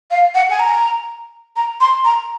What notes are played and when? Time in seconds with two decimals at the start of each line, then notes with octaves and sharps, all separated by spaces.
0.11 F5
0.35 F#5
0.50 G#5
0.59 A#5
1.56 A#5
1.81 C6
2.04 A#5